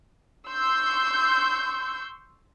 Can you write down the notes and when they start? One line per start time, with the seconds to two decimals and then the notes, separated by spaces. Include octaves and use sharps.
0.49 C6 C#6 E6 G6